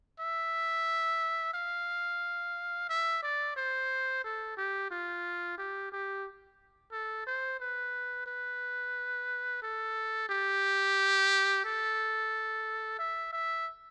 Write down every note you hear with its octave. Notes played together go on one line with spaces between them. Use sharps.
E5
F5
E5
D5
C5
A4
G4
F4
G4
G4
A4
C5
B4
B4
A4
G4
A4
E5
E5